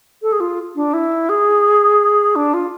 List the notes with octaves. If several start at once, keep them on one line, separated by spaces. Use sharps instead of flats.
A4
G#4
F4
D4
E4
G#4
D4
F4